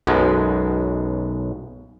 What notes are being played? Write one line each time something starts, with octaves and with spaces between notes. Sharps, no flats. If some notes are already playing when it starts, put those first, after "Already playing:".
B1 F#2 B2 G#3